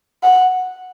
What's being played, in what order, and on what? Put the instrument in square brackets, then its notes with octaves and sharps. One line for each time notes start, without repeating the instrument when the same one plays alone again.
[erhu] F#5